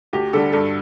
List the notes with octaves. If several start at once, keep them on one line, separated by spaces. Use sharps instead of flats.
D2 G4
D3 G3 A4
G2 A4